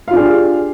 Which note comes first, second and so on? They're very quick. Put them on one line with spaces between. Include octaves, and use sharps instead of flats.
F5 F4 D4 G#4 G4